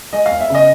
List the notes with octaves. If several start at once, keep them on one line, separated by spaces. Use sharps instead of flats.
G#3 D#5
F5
E2
E5
C#3 D#5